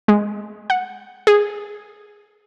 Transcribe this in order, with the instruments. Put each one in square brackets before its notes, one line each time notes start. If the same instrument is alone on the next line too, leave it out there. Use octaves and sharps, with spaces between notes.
[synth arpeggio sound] G#3
F#5
G#4